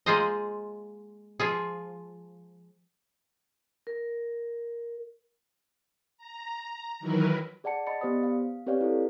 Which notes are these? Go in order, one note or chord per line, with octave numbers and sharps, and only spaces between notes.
G#3 A#3 F4 G#4 C5 D#5
F3 F4 G#4
A#4
A#5
D#3 E3 F#3 E4 A#4 B4
G#4 D5 F#5 A5 C#7
D#5 B5 A6 C#7
B3 G4 C5 D5 D#6
F5
C4 G4 B4 C#5 D5 F5
E4 A4